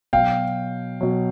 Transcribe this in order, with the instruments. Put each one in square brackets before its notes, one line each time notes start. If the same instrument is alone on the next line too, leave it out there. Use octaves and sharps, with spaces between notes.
[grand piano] B2 F#3 F5 G5
B2 F#3